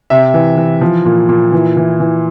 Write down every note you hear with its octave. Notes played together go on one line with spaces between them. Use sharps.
C3 E5
E3
E3
F3
A#2
A#2
E3
E3
E3